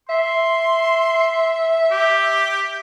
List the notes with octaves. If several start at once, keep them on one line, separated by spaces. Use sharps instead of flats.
E5 C6
G4